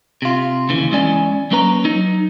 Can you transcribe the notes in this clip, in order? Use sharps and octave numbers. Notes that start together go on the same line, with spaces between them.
C3 F4
D#2 C#3 E3
E2 G#3 C#4 E4 D5 G#5
F#3 A#3 C#4 B4 A#5
F#3 D#4